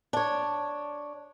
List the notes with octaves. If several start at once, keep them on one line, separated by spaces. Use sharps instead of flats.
D4 C#5